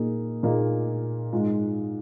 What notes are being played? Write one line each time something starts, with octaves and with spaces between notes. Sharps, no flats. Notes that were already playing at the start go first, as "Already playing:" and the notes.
Already playing: A#2 A#3 D#4 G#4
A#2 A#3 D#4 G#4
G#2 G#3 F4